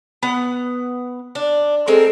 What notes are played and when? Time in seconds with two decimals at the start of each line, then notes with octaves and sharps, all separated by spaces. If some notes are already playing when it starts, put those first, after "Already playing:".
0.23 B3 F#5
1.35 D4
1.88 G#3 C4 A4 A#4